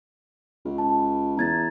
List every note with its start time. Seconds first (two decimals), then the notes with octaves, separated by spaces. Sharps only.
0.65 C#2
0.78 A5
1.37 E2 A#5 G#6 A6